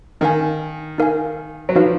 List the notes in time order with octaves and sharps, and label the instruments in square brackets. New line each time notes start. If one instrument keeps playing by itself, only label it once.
[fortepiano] D#3 [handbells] D#4 A#4 F5 G#5
[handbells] D#4 A#4 F5 G#5
[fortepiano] F#3
[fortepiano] F3 [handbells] D#4 F#4 B4 F5